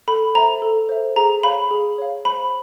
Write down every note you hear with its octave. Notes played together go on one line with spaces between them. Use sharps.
A4 B5
C5 E5 A#5
A4
C5 E5
G#4 A#5
C#5 F5 B5
G#4
C#5 F5
C5 B5